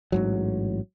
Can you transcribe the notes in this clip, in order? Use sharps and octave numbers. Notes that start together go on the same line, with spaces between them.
A1 G#2 F#3